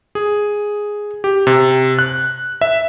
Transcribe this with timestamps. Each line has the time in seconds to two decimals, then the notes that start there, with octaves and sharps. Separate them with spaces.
0.15 G#4
1.24 G4
1.47 C3
1.99 F#6
2.61 E5